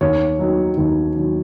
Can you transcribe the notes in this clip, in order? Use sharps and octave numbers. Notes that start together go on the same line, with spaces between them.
D#2 C#5
D#3 F#3
D#2
D#3 F#3